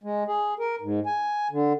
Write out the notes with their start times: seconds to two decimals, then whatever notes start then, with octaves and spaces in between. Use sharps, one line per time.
0.04 G#3
0.27 G#4
0.59 A#4
0.81 G#2
1.06 G#5
1.51 D3